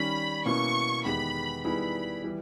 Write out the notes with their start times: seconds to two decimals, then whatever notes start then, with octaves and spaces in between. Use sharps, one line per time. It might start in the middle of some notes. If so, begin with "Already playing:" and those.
Already playing: D#3 G3 C#4 B5
0.46 B2 A#3 C#4 E4 C#6
1.05 E2 D#3 G#3 B3 G4 B5
1.64 D#3 G3 B3 E4 G#4 B5
2.24 E3 G3